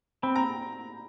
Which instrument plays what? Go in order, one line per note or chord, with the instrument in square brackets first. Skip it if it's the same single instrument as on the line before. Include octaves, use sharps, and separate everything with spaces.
[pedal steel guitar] C4 [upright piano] B5
[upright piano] A#5